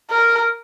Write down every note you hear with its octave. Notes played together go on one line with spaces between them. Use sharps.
A#4